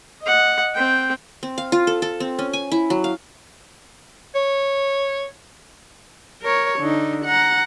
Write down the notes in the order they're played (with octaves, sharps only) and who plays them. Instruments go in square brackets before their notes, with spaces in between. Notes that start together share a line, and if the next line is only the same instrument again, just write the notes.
[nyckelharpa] D#5 F#5
C4 G5
[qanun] C4
F5
F4
A4
A4
C4
C#4
G#5
E4
F#3
F5
[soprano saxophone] C#5
[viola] A#4 C#5
D3 D#4
F#5 A#5